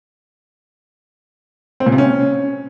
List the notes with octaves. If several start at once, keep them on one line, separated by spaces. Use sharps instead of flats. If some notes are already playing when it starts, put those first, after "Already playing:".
C4
A#2
C3
C#4